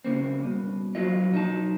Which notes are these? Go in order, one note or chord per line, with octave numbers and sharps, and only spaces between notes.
C#3 A#3 C4
G2 B2
F3 F#3 A#3 F4 D#5
B1 D#4 D#5 A5